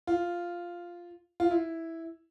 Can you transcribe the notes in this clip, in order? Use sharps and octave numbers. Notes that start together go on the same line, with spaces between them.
F4
F4
E4